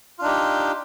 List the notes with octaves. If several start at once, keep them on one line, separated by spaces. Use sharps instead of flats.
D4 D#4 F4 G4